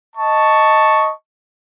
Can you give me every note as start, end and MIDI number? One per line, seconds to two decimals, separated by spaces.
0.16 1.12 75
0.16 1.12 81
0.16 1.12 85